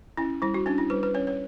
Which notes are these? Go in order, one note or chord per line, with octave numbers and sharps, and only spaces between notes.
C#4 E4
G3 E4
F#4
C#4 D4
E4
G3 B4
B4
C#4 C#5
C#5